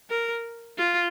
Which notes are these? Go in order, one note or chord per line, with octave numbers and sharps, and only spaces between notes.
A#4
F4